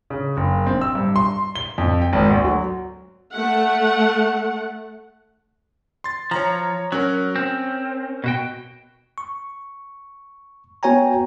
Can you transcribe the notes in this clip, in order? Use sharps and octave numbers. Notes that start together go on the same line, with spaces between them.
C#3
F#1
C4
E6
G2
C6
G7
F2
G5
G#1
D2
F#3
A3 F#5
C6 A6
F3 C#5 A#5
F#3 C#4 A#4
C4
B2 F#4 G5
C#6
B3 F#4 C#5 G5 G#5 A#5